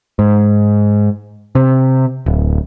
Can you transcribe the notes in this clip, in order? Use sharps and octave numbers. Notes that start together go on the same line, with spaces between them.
G#2
C3
D1